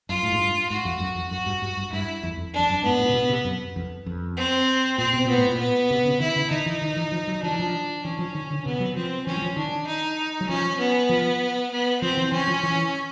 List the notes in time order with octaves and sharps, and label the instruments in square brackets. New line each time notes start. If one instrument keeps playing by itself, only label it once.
[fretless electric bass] F#2 [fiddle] F4
[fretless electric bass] A2
G#2
G2
[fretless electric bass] G#2 [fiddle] F#4
[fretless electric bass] F2
F#2
F2
[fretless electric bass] F#2 [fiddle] F#4
[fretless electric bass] G2
G2
G2
[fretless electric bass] G2 [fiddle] E4
[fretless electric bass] F2
F2
[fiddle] D4
[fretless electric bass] F2
F#2
[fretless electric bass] G#2 [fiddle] B3
[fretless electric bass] A2
C3
B2
C3
F#2
F2
F2
[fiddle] C4
[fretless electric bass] A#2 [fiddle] C4
[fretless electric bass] B2
[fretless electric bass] A#2 [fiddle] B3
[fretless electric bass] A2
A#2
[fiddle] B3
[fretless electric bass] C3
C#3
[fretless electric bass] D#3 [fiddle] E4
[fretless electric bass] C#3
[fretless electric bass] D#3 [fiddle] D#4
[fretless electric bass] E3
D#3
E3
F3
F#3
[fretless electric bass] F3 [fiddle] D4
[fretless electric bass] E3
F3
[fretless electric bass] E3 [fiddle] C#4
[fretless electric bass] F3
D#3
D3
[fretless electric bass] C3 [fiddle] B3
[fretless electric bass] F#3
[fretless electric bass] F3 [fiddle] C4
[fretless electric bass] E3 [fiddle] C#4
[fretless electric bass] F#3
F3
[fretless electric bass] D#3 [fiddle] D4
[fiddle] D#4
[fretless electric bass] F#3
[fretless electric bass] F3 [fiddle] C#4
[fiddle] B3
[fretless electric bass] F3
[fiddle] B3
[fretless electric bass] F3 [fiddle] C4
[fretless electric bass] E3
[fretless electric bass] E3 [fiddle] C#4
[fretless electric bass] F3
E3